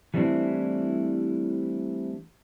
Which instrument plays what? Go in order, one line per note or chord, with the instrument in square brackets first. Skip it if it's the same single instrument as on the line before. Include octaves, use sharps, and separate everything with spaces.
[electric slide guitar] E3 G3 A3 C4 D4 E4